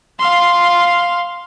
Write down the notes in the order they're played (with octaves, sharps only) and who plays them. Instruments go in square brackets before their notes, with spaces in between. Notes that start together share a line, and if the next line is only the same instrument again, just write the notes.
[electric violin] F5 C6